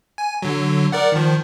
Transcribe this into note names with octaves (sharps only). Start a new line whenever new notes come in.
G#5
D3 F#3
A#4 D5 F#5
D#3 F3